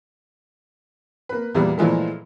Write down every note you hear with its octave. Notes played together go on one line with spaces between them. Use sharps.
A#3 B4
E2 A#2 G3 B3
A#2 E3 F3 G#3 A3